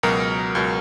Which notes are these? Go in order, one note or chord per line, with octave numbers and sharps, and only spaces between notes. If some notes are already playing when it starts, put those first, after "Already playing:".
C#2 B2 F#3 A#4
C#2 B2 F#3